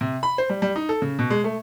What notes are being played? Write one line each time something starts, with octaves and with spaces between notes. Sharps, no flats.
C3
B5
C5
G3
G3
D#4
A4
C#3
B2
G#3
A3